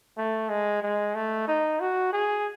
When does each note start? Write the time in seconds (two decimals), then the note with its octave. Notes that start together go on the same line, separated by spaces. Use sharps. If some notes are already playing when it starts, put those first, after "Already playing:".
0.18 A3
0.49 G#3
0.82 G#3
1.15 A3
1.48 D#4
1.80 F#4
2.13 G#4